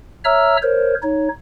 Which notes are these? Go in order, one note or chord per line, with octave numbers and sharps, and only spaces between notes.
C#5 E5 A#5 E6 F6
A#4 C5 C#5
D#4 C#5